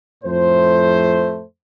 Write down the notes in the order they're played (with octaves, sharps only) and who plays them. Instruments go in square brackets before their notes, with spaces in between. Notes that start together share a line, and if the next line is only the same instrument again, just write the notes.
[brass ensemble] F2 A2 A3 C5